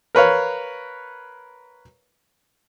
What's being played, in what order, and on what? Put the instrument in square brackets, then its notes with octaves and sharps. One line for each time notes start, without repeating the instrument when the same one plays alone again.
[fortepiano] A#4 B4 C#5 F5